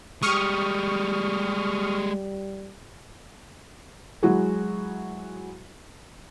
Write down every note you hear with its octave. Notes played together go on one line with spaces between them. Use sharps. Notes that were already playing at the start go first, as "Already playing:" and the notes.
G3 G#3 G4 C#6 D#6 F6
F#3 G#3 E4 F#4 G#4